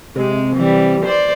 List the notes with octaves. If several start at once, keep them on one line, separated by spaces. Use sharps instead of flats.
C3 G#3
E3 G3
C5 D5